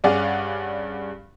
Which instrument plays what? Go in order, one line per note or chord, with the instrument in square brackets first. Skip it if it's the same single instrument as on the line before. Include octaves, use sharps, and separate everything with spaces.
[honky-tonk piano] G2 C#4 G#4 D5 F5 F#5